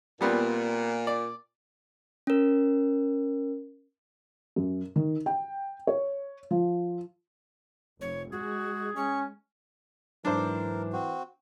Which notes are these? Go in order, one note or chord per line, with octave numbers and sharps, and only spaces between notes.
A#2 G3 B3 C4
D5
C#4 A#4
F#2
D#3
G5
C#5
F3
F1 C#5
G#3 F#4 G#4
C#4 C#6
G#2 E3 F#3 D4 A#4 C5
C4 F#4